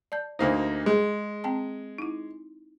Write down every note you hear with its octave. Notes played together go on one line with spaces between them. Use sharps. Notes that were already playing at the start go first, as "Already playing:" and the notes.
D5 A5 G6
D2 A#3 D#4 C5 D#6
G#3 G#4
C4 G5 A5
D#4 E4